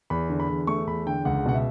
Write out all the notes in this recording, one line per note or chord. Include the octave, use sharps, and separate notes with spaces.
E2 B5
D3
B5
E2
A3 C#6
E2 B5
D3 G5
C#2 F#5
B2 F#5
E5